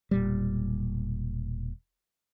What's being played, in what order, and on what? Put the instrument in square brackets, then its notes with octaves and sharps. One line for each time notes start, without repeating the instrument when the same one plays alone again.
[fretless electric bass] E1 A#2 G3